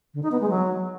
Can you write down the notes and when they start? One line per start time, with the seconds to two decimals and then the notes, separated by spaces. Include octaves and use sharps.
0.14 D3
0.23 D#4
0.32 B3
0.41 G#3
0.49 F#3